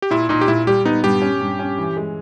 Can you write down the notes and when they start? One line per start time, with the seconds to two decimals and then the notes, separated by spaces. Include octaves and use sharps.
0.02 G4
0.11 A#2 E4
0.29 A#2 D#4
0.41 G4
0.48 A#2 E4
0.67 G3 G4
0.85 B3 D#4
1.04 G2 G4
1.22 C#4
1.41 G2
1.59 C#4
1.78 E3
1.97 G#3